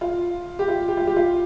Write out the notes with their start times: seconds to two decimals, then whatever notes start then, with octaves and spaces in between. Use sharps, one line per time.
0.01 F4
0.59 G4
0.68 F4
0.88 G4
0.97 F4
1.07 G4
1.16 F4